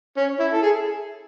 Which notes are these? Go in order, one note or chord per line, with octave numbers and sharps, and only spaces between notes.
C#4
E4
A4
G#4